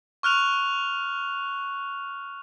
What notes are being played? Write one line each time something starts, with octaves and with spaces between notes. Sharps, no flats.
C#6 F6 F#6 F7